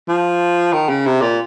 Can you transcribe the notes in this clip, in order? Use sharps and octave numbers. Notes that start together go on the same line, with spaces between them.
F3
D#3
C#3
C3
A#2